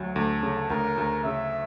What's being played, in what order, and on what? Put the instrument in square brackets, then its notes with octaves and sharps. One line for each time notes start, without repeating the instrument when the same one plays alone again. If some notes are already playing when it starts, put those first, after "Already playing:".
Already playing: [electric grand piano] D2 F#3
[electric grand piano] D2 [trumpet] A4
[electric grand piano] C#3
[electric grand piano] D2 [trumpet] A#4
[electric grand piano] D2
[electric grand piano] C#3 [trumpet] E5